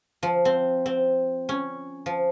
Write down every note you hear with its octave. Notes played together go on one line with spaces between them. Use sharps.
F3
C4
C4
C#4
F3